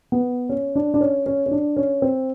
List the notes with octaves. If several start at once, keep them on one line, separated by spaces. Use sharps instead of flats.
B3
C#4
D4
D4
C#4
C#4
C#4
D4
C#4
C4